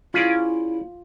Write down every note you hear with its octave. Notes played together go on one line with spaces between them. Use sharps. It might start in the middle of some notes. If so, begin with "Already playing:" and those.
C#4 E4 F4 G#4 D5